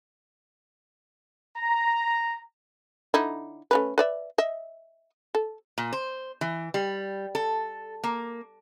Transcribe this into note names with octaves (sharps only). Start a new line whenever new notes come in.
A#5
D3 D#4 E4
A3 C#4 B4
B4 D5 E5
D#5 E5
A4
A#2
C5
E3
G3
A4
A#3